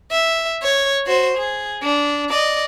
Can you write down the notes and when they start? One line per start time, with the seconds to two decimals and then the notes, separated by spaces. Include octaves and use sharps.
0.11 E5
0.63 C#5
1.06 F#4 C5
1.37 G#4
1.83 D4
2.30 D5 D#5